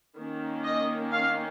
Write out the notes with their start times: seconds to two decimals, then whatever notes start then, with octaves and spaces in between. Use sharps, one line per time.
0.17 D#3 A#3 C#4
0.64 D#5
1.12 F5